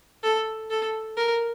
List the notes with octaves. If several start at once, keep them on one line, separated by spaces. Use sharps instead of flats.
A4
A4
A#4